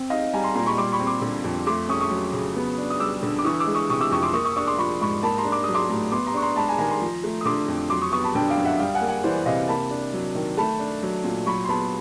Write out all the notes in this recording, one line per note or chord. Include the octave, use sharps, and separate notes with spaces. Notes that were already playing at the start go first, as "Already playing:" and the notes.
Already playing: C4
D#4 D#5 F5
G3 G#5 A#5
A#5 C6
A#2 A#5 C6
B5 C#6
G3 C6 D6
B5 C#6
C4
C6 D6
D3
F2
A3 C6 D6
C#4 C#6 D#6
C#6 D#6
F#3
C#3
B3
D4
D#6
G3 D6 E6
D3
D6
E3 C#6 D#6
D6 E6
G#3
C#6 D#6
C3 C#6 D#6
D6 E6
F2 C#6 D#6
C6 D6
A#3 C#6 D#6
C#6 D#6
D4 C#6 D#6
C6 D6
F3 B5 C#6
G#2 B5 C#6
A#3 A5 B5
A#5 C6
D4
D6
F#3 D#6
C6 D6
A2
B3 C6 D6
A#5 C6
D4 C#6
A#5 C6
G#3 A5 B5
G#5 A#5
D#3 G#5 A#5
A#5 C6
F3
A3
D#6
D3 C6 D6
F2
F#3 C6 D6
C#6 D#6
B3 C#6 D#6
A5 B5
D3 G5 A5
F5 G5
F#2
E5 F#5
G3 F5 G5
F#5 G#5
A#3
F#5 G#5
E3 C5 D5
C3 D#5 F5
A#3 A5 B5
D4
F#3
D#3
A3 A5 B5
D4
F#3
A#2
F#3 B5 C#6
C6
B3 A5 B5